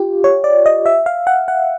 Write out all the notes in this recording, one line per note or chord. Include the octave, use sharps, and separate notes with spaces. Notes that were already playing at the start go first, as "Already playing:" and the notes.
Already playing: F4 G4
C#5
D5
D#5
E5
F5
F#5
F#5